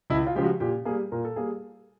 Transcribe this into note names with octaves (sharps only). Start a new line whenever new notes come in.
C#2 E4
F4
C#3 F3 G#3 G4
F#4
A#2 G4
G3 A#3 G#4
A#2 A#4
A4
G3 A#3 G#4